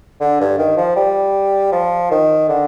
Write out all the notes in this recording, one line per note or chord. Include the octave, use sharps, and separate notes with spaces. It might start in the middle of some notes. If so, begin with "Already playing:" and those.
D3
G2
D#3
F3
G3
F3
D#3
D3